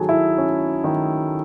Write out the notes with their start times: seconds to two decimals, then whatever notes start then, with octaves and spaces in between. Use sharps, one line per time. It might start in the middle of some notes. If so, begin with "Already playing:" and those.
Already playing: D#3 F#3 G#4 A4 G#5 A5
0.09 E4 E5
0.38 C#4
0.84 D#3